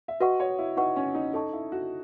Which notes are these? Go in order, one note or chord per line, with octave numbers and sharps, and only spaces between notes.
E5
F#4 B4 D#5 F#5 C#6
C#5
E4
D#4 F#4 B4 F#5 C#6
C#4
D#4
D#4 A4 D#5 A5 C#6
E4
F#4